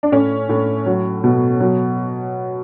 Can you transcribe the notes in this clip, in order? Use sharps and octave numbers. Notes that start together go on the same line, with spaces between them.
D4
A2 C#4
A2
F#3
B2
F#3